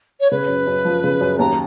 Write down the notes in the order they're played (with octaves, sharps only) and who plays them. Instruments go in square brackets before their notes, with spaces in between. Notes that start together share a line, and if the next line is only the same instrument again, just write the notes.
[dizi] C#5
[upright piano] C#3 [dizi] B4
[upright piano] F#2
F#2
F3
C#3
F#2
[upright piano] D#2 [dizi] A#5